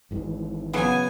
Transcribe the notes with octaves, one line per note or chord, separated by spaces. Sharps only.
G#1 G#2 E3
C#3 F#3 B3 G#5